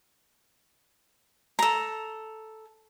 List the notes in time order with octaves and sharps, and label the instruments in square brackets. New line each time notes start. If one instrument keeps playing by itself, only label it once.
[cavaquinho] A4 A#5